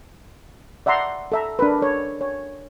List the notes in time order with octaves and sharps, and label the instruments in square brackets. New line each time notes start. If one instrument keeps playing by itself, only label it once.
[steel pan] D5 E5 F#5 A#5 C6
A4 E5 A#5
D4 A#4 B4
A4 C#5
C#5